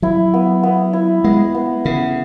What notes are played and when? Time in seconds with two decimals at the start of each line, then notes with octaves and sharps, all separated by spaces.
0.02 F#3 E4
0.34 B3
0.63 B3
0.93 E4
1.24 G#3 B3
1.55 B3
1.85 C#3 B3